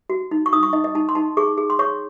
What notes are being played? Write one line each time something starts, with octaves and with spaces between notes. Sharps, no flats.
F#4
D#4
C#6
D#4 D#6
C#6
D#4 D#5
D#5
D#4 A5
C6
D#4 A5
G#4 C#6
G#4
C6
C#5 C#6